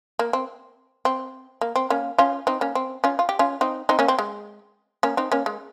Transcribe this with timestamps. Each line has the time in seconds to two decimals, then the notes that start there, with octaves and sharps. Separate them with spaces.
0.19 A#3
0.33 C4
1.05 C4
1.61 A#3
1.76 C4
1.90 A#3 C#4
2.18 C#4 F4
2.47 C4 D#4
2.61 A#3 C#4
2.75 C4
3.04 C#4 F4
3.19 F4
3.29 G4
3.39 C#4 F4
3.61 C4 D#4
3.89 C4 D#4
3.99 A#3 C#4
4.08 C4
4.19 G#3
5.03 A#3 C#4
5.17 C4 D#4
5.32 A#3 C#4
5.46 G#3